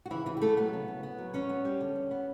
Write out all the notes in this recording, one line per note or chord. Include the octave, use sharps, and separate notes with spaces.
F#4
C#3 E3 E4
C#3 E3 E4
G4
A3 B3 A4
F#3 B3 B4
C#3
C#3
B3
F#3
E2 C#4 C#5
B3
G3
D3
E2
B3